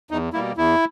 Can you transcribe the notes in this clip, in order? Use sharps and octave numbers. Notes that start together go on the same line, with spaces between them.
E2 D#4
B2 G3 A#3 E4
E2 E4